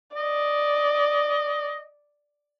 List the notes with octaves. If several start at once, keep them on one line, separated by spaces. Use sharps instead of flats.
D5 D#5